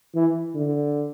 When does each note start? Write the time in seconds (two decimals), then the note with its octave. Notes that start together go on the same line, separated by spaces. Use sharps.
0.15 E3
0.55 D3